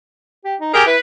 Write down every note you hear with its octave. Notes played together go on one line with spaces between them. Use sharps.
G4
D#4
G4 G#4 A#4 G#5
E4 B4